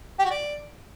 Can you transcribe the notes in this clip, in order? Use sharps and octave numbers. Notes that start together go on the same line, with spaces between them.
G4
F#4
D5